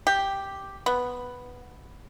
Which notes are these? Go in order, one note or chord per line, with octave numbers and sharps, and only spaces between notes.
G4
B3